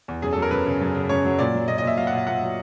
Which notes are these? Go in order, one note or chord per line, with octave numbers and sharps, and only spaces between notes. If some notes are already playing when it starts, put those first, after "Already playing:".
E2
F#2 G#4
A4
F#3
A#4
F#2 B4
C#3
F#2
C#3
F#2 C#5
F#3
A#2 D5
F#3
A#2 D#5
D#5
A#2 E5
F#3 F5
F#5
A#2
F5
A#2 F#5
F#3